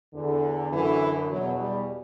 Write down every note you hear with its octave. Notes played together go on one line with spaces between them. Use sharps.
E2 D3
F#2 D3 E3
E2 B2 F#3
G3